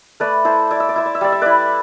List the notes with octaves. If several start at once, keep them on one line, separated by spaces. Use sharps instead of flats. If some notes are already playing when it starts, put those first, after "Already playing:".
A3 B4 D5
E4 A4 C5
E4 D5
E5
D5
E4 E5
D5
E5
G3 D5
E5
E4 B4 D5